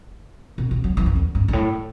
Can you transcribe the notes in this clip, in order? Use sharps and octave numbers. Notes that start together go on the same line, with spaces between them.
B2
B2
F#3
E3
F#2
E2
G2
G2
A2